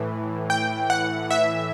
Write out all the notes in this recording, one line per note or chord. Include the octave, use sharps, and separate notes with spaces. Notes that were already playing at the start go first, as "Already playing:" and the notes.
Already playing: A2 E3
G5
F#5
E5